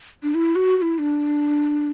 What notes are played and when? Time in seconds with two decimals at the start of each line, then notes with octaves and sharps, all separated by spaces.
0.23 D4
0.34 E4
0.55 F#4
0.77 F#4
0.82 E4
0.99 D4